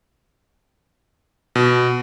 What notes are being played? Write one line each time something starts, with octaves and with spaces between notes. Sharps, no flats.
B2